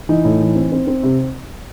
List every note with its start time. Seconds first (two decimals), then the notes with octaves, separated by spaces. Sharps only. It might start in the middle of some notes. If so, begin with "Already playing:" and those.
0.09 E3 D#4
0.25 A2
0.41 E3
0.55 C4
0.72 C4
0.87 C4
1.03 C3